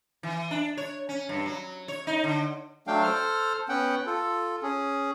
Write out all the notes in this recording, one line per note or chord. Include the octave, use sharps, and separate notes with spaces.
E3
D4
C#5
C#4
G2
F#3
C#5
D#4
D3
F#3 A3 D4 F5 G5
A4 C5 F6
B3 C#4 F#5 G5
F4 A4
C#4 G#4